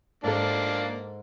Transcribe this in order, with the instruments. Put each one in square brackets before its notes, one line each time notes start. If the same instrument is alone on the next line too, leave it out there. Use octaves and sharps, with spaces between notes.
[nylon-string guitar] G#2 A4 [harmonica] A#3 D4